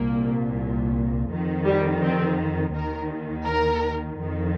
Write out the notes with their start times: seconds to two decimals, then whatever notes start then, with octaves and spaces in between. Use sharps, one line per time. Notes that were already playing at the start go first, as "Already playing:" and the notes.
Already playing: C2 A#2 A#3
1.29 F2 D#3
1.65 G3
2.02 C4
2.74 D#2 D#3 A#4
3.45 A#4
4.18 F2 D#3